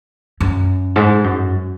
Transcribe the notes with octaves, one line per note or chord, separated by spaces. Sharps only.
F#2
G#2
F#2